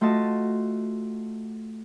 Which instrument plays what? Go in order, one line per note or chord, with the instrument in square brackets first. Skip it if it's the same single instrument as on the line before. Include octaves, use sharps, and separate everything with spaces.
[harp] A3 F4 F#4 D#5 A5 F6